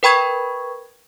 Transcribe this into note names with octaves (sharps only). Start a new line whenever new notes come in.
A#4 B4 G5 B5 C#6 G#6